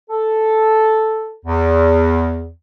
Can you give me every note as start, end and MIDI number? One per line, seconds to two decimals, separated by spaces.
0.09 1.35 69
1.46 2.50 40